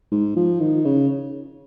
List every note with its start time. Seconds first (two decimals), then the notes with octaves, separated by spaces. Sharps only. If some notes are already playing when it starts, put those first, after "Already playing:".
0.12 G#2
0.36 F3
0.60 D#3
0.85 C#3